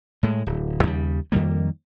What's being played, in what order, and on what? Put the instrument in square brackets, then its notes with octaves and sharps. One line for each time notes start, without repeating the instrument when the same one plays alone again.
[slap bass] A2 G#3
D1
D#2 C#3 G3
F2 D#3 G3 A#3